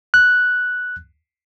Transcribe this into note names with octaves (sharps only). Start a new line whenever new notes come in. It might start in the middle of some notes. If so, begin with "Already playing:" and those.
F#6